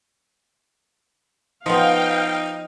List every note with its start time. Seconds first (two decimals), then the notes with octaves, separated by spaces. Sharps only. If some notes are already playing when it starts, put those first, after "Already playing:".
1.66 F3 B3 D#4 F5 G5